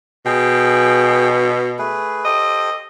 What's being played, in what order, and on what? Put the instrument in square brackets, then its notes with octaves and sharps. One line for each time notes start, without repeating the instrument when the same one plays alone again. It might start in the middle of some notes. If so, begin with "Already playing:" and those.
[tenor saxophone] B2 [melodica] G#4 G5
[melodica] A3 G#4 B4
[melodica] G4 A4 C5 [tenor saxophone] D#5